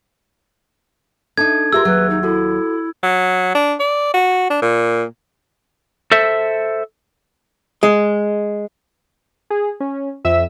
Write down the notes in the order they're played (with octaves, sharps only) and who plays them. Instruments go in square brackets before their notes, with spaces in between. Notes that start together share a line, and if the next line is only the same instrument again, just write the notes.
[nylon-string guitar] D4 D#4 [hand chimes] A4 A5 [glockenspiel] G#6
[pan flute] F4 [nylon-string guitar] G4 A#4 [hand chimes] G#4 E5 [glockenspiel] E6
[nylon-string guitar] D#2 F#3 [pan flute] B4
[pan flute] D#4
[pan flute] E4 [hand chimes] F#4 A4
[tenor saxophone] F#3
D4
D5
F#4
D4
A#2
[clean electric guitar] A4 C5 E5
[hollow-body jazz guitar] G#3
[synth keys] G#4
C#4
F2 E5 E6